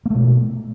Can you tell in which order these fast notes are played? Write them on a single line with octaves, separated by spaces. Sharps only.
A#3 A3 B2